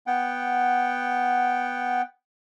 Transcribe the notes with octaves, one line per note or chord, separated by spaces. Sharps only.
B3 F#5 G5